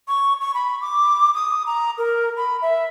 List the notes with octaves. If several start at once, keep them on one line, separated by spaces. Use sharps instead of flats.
C#6
C#6
B5
D6
D#6
A#5
A#4
B5
E5